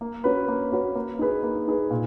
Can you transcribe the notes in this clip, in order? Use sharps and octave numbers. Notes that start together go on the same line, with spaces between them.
A#3
C#4 F#4 B4
A#3
C#4 F#4 B4
A#3
D#4 G#4 B4
A#3
D#4 G#4 B4
A#2